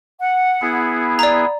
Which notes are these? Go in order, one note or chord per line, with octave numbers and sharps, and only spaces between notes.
F#5
B3 E4 G#4
D5 A#5